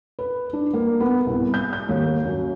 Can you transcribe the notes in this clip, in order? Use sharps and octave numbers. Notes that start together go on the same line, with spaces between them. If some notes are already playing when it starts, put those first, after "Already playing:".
B4
D4
A#3
B3
C2
G6
G6
D#2
F#2